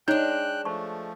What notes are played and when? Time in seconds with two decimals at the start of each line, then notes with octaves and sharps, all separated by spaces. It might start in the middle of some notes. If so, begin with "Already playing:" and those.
0.08 G#3 D4 D#4 C#5 G5 F#6 G6
0.65 F3 A3 C5 A5 C#6